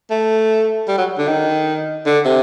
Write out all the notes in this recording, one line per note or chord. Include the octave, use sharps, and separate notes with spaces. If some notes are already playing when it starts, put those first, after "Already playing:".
A3
G3
F#3
D3
D#3
D3
C3